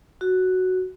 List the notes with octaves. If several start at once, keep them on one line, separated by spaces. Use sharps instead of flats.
F#4